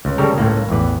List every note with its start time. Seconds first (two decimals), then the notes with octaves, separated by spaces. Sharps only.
0.05 C#2
0.18 C#3 G3 A4 A#4
0.38 C#2 A2 A#3
0.69 A1 E2 B4